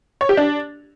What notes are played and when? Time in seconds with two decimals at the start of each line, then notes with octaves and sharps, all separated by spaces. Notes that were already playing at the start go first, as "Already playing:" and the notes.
0.21 C#5
0.29 G4
0.37 D4